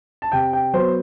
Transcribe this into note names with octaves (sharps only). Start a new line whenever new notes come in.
A5
C3 G5
G5
F#3 B3 C5